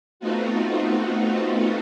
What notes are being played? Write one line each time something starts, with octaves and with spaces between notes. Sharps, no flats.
A3 B3 C4 D#4 F4 F#4